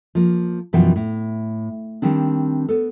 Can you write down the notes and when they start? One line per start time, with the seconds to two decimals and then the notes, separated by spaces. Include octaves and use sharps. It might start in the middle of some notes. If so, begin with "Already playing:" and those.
0.15 F3 A#3
0.73 F#2 B2 E3 F3 F#4 G5
0.96 A2
2.02 D#3 G3 C4 D4
2.69 B3 A4